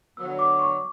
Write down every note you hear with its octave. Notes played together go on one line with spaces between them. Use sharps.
D3 F#3 B3 E6
D6
C#6